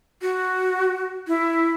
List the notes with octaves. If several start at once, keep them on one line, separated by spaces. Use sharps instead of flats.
F#4
E4